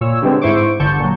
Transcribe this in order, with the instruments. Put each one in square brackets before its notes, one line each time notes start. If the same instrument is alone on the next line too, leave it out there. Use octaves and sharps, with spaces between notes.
[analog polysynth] A#2 C#5 E6
D3 G3 G#3 B3 C4 C#5
G#2 E4 C5 C#6 D6
G1 D3 A5 C#6 G6 C#7
A#2 F#3